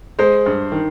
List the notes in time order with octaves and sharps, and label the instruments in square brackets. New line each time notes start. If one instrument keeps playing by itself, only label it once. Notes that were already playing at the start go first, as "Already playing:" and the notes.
[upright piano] G#3 [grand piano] C5
[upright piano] G2
D#3